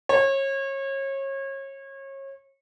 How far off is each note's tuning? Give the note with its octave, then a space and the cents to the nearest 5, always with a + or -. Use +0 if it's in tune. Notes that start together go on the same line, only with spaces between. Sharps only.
C#5 -30